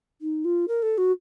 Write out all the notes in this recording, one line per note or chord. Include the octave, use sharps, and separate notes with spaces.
D#4
F4
A#4
A4
F#4